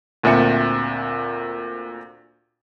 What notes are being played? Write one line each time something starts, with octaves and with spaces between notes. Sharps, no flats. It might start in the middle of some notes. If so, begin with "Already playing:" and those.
D2 A#2 C4 E5 C#7